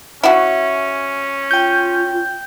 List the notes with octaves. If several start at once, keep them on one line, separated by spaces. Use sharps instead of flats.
C#4 E4 F#4
F4 G5 G6